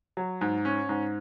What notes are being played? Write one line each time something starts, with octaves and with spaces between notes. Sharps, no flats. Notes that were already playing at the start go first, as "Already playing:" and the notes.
F#3
G#2
C#4
G#2